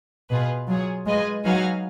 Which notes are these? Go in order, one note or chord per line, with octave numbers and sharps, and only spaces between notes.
B2 F4 G#4 B4
F#3 F4 G#4 C#5
G#3 F4 B4 D#5 G#5
F#3 D#4 F#4 B4 F5 G#5